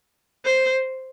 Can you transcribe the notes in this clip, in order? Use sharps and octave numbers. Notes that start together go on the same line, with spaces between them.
C5